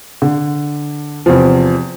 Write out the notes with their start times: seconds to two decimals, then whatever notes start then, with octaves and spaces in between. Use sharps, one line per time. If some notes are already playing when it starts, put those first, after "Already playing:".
0.22 D3
1.26 E2 C3 F3